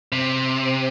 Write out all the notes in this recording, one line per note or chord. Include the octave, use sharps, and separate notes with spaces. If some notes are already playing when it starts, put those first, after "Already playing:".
C3